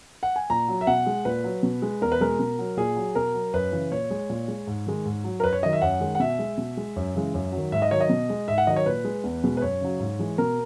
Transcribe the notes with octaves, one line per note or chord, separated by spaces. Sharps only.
F#5
G#5
A#2 A#5
F#3
E5
B2 F#5
G#3
A#2 B4
F#3
B2
G#3
E2 A#4
B4
B2 G#3 A#4
B2
F#3
A#2 G#4
F#3
B2 A#4
F#3
F#2 B4
C#3 E3
A#2 C#5
G#3
A#2
G#3
G#2
D#3 G#3
G#2
F#3
A#4
F#2 B4
C#5
D#3 F#3 D#5
E5
F#2 F#5
D#3 G#3
F#5
B2 E5
G#3
B2
G#3
F#2
C#3 E3 G#3
F#2
D#3 F#3
G#2 E5
D#5
D#3 F#3 C#5
D#5
B2
G#3
G#2 E5
F#5
D#3 F#3 D#5
C#5
A#2 B4
G#3
E2
B2 G#3
B4
F#2 C#5
C#3 F#3
G#2
E3 G#3
B2 A#4